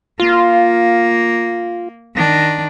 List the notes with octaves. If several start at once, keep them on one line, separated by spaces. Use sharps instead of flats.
A#3 F4
D#3 D4